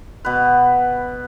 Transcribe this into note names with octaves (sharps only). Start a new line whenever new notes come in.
B2 B4